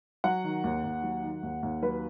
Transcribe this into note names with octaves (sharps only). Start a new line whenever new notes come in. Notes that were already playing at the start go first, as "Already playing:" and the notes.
F#3 F#5
D#3
D#2
D#2
F#3
D#3
D#2
D#2
F#3 B4